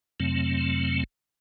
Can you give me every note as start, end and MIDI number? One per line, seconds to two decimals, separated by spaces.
0.20 1.04 41
0.20 1.04 48
0.20 1.04 54
0.20 1.04 57
0.20 1.04 60